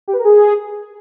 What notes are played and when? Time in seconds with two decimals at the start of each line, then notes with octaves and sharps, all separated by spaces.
0.08 G4
0.13 B4
0.19 A#4
0.24 G#4